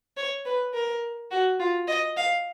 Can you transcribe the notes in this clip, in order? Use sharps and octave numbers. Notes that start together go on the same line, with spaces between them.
C#5
B4
A#4
F#4
F4
D#5
F5